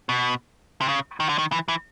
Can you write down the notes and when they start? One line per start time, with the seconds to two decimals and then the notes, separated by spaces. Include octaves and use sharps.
0.09 B2
0.81 C3
0.88 C#3
1.20 D#3
1.29 D3
1.38 D#3
1.52 E3
1.68 E3